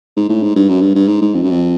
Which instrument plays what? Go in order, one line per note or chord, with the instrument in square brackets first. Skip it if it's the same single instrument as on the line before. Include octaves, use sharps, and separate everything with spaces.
[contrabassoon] G#2
A2
G#2
G2
F#2
G2
G2
G#2
G#2
F2
F#2
F2